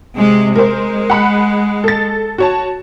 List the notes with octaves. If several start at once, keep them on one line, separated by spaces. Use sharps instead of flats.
C3 G#3
G#3 A#4 C5
F#5 B5
A4 A6
F#4 C#5 A5